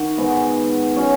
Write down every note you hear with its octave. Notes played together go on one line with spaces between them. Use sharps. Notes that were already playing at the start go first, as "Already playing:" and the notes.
Already playing: D#3 F#4
G#2 G#3 B3
F#3 C#4